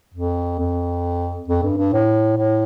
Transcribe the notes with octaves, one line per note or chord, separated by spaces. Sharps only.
F2
F2
F2
G2
G2
A2
A2